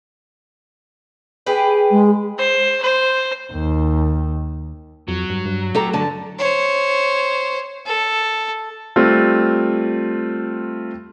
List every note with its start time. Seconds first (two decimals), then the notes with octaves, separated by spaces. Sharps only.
1.46 G4 G#4 B4
1.91 G#3
2.38 C5
2.82 C5
3.53 D#2
5.08 F2 F#3
5.30 G2
5.45 G2
5.75 A3 G4 A4 A#5
5.93 D3 A5
6.39 C5 C#5
7.86 A4
8.96 G3 A3 C4 F4